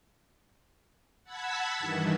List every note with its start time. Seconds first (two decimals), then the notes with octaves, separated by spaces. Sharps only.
1.24 F#5 A5 B5 E6 G#6 B6
1.78 G2 D#3 E3